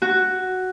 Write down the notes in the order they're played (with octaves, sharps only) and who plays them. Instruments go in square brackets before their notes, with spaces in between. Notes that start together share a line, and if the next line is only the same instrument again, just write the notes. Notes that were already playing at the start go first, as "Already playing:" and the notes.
[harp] F#4